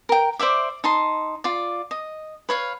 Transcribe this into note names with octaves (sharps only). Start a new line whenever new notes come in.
A#4 G5
C5 D5 E5 D6
D#4 A5 C6
F4 D5
D#5
B4 C#5 F5